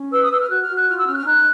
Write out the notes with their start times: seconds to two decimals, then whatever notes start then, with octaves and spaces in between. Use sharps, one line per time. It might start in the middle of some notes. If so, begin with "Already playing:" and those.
Already playing: C#4
0.11 B4 E6
0.21 D#6
0.30 B4 E6
0.40 F6
0.49 F#4 F#6
0.61 F6
0.68 F#4
0.74 F#6
0.87 F4 F6
0.97 E6
1.06 C#4 F6
1.12 F#6
1.17 F6
1.25 D#4 F#6